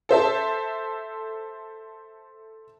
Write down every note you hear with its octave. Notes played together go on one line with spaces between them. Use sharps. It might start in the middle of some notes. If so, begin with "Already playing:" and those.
A4 C5 E5 A5